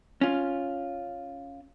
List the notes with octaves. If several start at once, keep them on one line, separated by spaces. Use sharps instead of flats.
C#4 F4